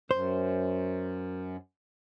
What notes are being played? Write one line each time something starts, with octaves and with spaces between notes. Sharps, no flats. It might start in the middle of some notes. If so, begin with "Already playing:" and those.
F#2 C5